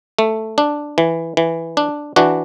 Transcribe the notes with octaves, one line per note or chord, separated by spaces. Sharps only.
A3
D4
E3
E3
D4
E3 D4 F#4